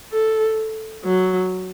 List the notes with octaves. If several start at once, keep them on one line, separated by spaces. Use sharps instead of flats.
A4
F#3